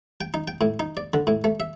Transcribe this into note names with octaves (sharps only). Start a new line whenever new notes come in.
G5
D#4
G5
A2
D#4
D5
D3
A2
A3
E5